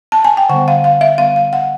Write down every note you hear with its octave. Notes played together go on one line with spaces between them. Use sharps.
A5
G#5
G5
D3 G3 B3 F#5
F5
F5
E5
D3 G3 B3 F5
F5
F#5